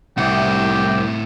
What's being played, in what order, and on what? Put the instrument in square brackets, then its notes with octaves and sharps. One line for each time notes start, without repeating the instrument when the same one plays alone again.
[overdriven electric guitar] C2 [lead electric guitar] A2 F#5 [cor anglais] G4